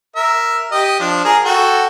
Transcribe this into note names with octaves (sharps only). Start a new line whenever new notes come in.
A#4 E5
G4 D#5
F3 D4
G#4 A#4
F#4 A4 G5